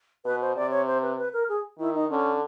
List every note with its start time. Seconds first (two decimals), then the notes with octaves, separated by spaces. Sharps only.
0.25 B2 B4
0.41 C5
0.56 C3 D5
0.71 C#5
0.87 C5
1.02 B4
1.18 B4
1.33 A#4
1.49 G#4
1.79 D#3 E4
1.94 D#4
2.10 D3 C#4